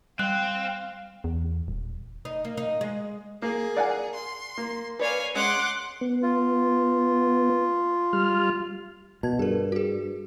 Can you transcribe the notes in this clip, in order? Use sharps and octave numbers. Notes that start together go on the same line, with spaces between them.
G3 C4 F5 F#6
E2
D#1
D#4
A#3
D#4
G#3
A#3 G#4
A#4 D5 F5 F#5 G#5
C6
A#3
B4 C#5 D5 F5 G#5
G#3 C#4 F#5 C6 D6
B3
F4
G3 F6
B2 A5 G#6
G2 G#4 A#4
F#4 G#4